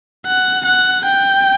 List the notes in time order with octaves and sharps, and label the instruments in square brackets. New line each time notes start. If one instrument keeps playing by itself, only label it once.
[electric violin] F#5
F#5
G5